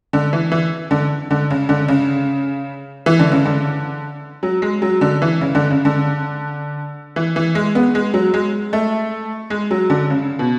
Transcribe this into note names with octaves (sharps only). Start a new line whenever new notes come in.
D3
E3
E3
D3
D3
C#3
D3
C#3
E3
D3
C#3
D3
F#3
G#3
F#3
D3
E3
C#3
D3
C#3
D3
E3
E3
G#3
B3
G#3
F#3
G#3
A3
G#3
F#3
D3
C#3
B2